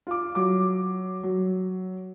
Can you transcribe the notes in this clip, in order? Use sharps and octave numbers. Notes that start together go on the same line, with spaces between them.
F4 D6
F#3 D6
F#3